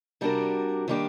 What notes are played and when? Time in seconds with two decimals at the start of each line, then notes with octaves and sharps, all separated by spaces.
0.21 C3 G3 D4 F#4 A#4
0.88 D#3 G3 A#3 D4 G4